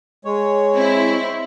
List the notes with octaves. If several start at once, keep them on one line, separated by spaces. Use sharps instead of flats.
G#3 C#5
C4 E4